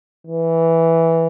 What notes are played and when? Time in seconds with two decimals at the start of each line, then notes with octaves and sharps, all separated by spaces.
0.27 E3